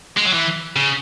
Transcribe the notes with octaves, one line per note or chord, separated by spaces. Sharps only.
G#3
F#3
E3
C#3